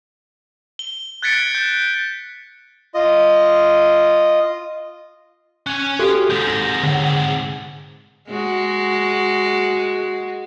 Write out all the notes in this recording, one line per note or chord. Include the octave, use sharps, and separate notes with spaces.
G7
F#6 G#6 A6 B6 C#7 D7
G6
F4 D#5
C#4 G#5 F#6
F#4 G4 A4
G#2 C3 G6
A#6
D3 F#5
G#3 F#4